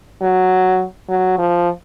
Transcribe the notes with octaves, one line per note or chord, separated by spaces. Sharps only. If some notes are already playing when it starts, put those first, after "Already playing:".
F#3
F#3
F3